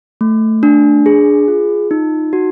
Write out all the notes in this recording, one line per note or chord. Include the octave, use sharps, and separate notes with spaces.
A3
D4
G#4
F4
D#4
F#4